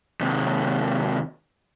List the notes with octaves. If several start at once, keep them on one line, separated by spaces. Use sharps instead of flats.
D#2 C3